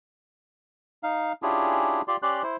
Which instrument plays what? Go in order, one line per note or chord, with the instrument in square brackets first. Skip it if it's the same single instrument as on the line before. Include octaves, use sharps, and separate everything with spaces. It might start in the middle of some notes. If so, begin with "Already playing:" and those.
[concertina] D#4 F5
C#4 D4 E4 F4 G4 G#4
F4 G4 D5 C6
C#4 G4 D5 C6 F#6
E4 C5